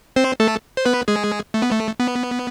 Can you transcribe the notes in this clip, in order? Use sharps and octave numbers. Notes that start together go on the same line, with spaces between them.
C4 C5
A3 A4
C5
B3 B4
G#3 G#4
A3
B3
A3
B3